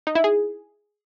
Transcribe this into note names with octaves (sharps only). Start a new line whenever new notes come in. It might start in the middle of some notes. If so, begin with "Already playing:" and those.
D#4
E4
G#4